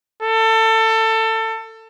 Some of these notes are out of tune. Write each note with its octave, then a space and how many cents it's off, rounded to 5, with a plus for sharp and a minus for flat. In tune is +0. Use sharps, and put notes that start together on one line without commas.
A4 +25